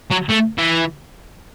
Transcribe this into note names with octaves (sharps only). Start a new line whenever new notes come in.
F#3
A3
E3